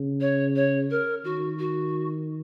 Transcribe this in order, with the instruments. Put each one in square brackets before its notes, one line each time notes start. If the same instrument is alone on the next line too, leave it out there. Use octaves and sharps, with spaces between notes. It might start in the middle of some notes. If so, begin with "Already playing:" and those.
Already playing: [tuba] C#3
[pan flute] C#5
C#5
A#4
[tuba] D#3 [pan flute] F#4
[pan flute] F#4